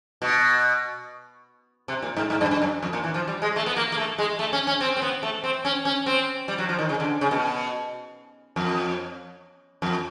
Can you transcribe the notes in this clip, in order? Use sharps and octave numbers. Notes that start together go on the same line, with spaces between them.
B2
C3
A#2
G#2
G#2
G2
G2
F#2
F2
A#2
E3
F3
G3
G#3
A3
B3
A#3
A#3
A3
G#3
A3
C#4
C#4
C4
C4
B3
A3
C4
C#4
C#4
C4
G3
F#3
F3
D#3
C#3
D3
C#3
B2
F2
F2